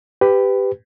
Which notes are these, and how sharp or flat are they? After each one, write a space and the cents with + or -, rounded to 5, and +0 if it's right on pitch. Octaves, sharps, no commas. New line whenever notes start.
G4 +5 B4 +20